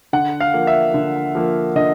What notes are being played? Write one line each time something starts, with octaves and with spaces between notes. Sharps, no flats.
D3 F#5
F5
F3 A#3
E5
D3
F3 A#3
D3 D#5